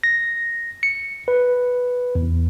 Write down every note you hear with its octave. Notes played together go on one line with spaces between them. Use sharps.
A#6
C#7
B4
E2